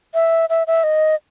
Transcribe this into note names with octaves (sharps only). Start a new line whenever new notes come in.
E5
E5
E5
D#5